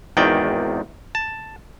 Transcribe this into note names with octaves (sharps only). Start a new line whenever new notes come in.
G#1 E2 D#3 D5 G5
A5